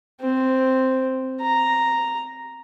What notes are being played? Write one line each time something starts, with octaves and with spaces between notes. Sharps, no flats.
C4
A#5